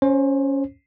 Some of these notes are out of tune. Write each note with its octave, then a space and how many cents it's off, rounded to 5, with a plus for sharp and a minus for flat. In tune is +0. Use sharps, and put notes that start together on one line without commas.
C#4 +0 C5 +25